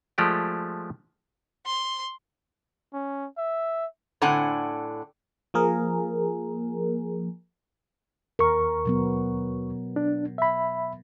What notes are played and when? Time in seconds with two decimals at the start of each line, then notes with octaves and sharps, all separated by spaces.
0.18 F3 G#3 A3 G4 D5
1.66 C6
2.93 C#4
3.38 E5
4.22 A2 D3 C4 F#5 G#5
5.54 F3 A#3 G#4 A#4
8.39 D#2 A#4 C#6
8.85 B2 F#3 B3
9.96 D4
10.38 E5 B5